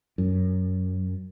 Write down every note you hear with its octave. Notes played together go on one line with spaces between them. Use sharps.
F#2